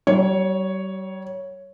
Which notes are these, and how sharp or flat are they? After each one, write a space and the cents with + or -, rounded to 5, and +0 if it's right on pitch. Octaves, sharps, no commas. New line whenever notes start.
G3 -40 C#5 +0